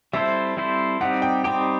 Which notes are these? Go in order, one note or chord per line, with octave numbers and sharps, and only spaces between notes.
G3 C4 E4 A4 C5 E5
G3 C4 E4 A4 C5
G3 C4 D#4 G4 F#5
G5
G3 C4 D#4 G4 G5